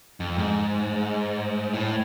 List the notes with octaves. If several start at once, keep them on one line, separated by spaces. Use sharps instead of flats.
F2
G#2
A2